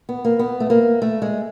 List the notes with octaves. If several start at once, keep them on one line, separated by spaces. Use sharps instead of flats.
B3
A#3
B3
A3
A#3
A3
G#3